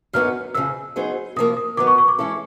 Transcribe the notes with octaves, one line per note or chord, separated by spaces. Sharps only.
F#2 D3 F#3 B3 D#4 F6
F2 C#3 F3 E6
F#3 B3 D#4 G#4 C5
C3 F3 A#3 D#6
D#6
D#3 F#3 B3 D6
C#6
C#6
D6
E3 G#3 C#4 E4 A4